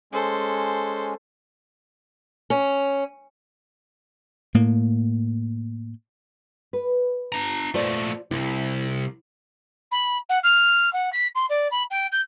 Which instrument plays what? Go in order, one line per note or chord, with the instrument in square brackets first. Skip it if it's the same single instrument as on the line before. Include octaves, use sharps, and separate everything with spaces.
[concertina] G#3 C#4 [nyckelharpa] A4 C5
[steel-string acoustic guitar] C#4
[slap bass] A2 A#3
[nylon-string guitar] B4
[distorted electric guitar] D4 A#5
[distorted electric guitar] A#2 A3 [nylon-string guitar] F4 C5 D5
[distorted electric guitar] C2 [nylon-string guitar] E4
[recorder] B5
F#5
F6
F#5
B6
C6
D5
B5
G5
G6